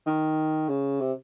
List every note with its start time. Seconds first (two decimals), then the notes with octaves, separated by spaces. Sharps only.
0.06 D#3
0.69 C#3
1.01 C3